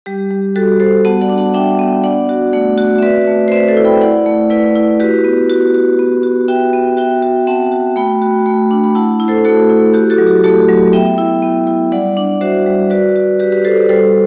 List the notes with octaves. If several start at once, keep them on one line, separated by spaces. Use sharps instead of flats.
G3 G4
G3
G3 F#4 A4
F#4 A4 C5
B3 F#5 A5
D5 F#5
D4
F#5 A5
D4 E5 G5
B3
D4 D5 F#5
F#4
A3 D5 F#5
F#4
E5
C4 B4 D5
A3
C5
C4 B4 D5
A4 C5
E4
G5 B5
E4 D5 F#5
A3
E4 B4 D5
E4
F#4 G4 B4
B3
F#4
F#4
B3
F#4
F#4 E5 G5
B3
F#4 E5 G5
F#4
C4 F#5 A5
F#4
A3 G5 B5
F#4
A3
D4
B5
E4 F#5 A5
E4
A4 C5
A3 F#4 A4
E4
F#4 G4
F#4 A4
F#3
G4
A3 F#4 A4
F#3
B3 E5 G5
E4
B3
E4
G3 D5 F#5
D4
F#4 C5 E5
G3
F#4 B4 D5
F#4
F#4 G4 B4
G4 B4
F#4 A4 C5
B4 D5
G3 A4 C5